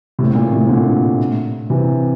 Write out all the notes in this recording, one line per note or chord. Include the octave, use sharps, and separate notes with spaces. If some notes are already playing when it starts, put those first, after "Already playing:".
A2 C3
A2
A#2
A2 C3
A#2 D3
C3 E3